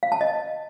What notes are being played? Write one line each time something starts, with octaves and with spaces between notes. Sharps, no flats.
F5
A5
D#5